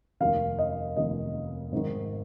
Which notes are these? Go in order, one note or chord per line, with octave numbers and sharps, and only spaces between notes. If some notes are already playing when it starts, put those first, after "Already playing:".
F1 D#2 D#3 F5
D#5
F1 D#2 D#3 D#5
G#1 G#2 D#3